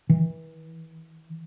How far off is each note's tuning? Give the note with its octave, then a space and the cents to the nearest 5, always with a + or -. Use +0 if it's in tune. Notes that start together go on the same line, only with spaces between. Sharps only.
E3 -30